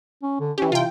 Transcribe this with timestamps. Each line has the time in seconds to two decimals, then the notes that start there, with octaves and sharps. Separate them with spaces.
0.22 C#4
0.40 D3
0.58 E3 C#4 G4
0.72 C3 F4 G5